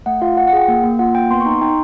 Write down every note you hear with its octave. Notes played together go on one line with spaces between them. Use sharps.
A3 F#5
F4 F5
F4 F#5
F#5
G#4 G5
A#3
A#3
F4 F#5
A#3 G5
B3 C6
C#6
D#4
C6
D#4 G5